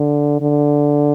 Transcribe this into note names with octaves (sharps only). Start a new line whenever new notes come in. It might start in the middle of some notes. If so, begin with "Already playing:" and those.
Already playing: D3
D3